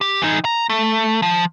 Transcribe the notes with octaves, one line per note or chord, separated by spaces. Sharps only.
G4
E3 D#4
A#5
A3
F3